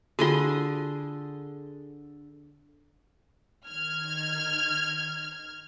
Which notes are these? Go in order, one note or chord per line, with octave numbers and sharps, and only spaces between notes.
D3 F4 F#4 G#4 C6
D#3 F6 G#6